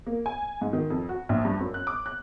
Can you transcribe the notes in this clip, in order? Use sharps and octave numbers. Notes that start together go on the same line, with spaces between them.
A#3
G#5
G#2
D#3
F2
F#4
A#1
G2
F#2
F#6
D6
F#6